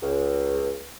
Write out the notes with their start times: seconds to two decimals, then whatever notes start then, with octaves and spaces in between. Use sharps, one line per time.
0.02 C#2